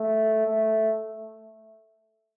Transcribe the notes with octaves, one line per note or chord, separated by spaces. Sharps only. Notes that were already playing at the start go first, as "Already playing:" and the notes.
Already playing: A3
A3